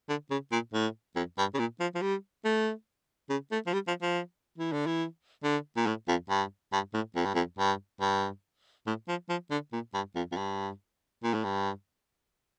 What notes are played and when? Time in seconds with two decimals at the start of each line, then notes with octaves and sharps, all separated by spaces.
0.09 D3
0.31 C#3
0.52 A#2
0.74 A2
1.16 F2
1.38 G2
1.54 C#3
1.59 A#2
1.80 F3
1.95 F3
2.02 G3
2.45 A3
3.30 C#3
3.52 A3
3.67 F3
3.74 G3
3.88 F3
4.02 F3
4.59 E3
4.73 D3
4.87 E3
5.44 D3
5.77 A#2
5.87 A2
6.08 F2
6.30 G2
6.73 G2
6.94 A2
7.16 F2
7.26 G2
7.35 F2
7.59 G2
8.01 G2
8.87 A2
9.08 F3
9.30 F3
9.51 D3
9.73 A#2
9.94 G2
10.16 F2
10.32 F2
10.37 G2
11.24 A#2
11.34 A2
11.44 G2